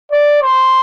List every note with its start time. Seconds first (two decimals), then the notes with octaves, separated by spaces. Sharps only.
0.11 D5
0.43 C5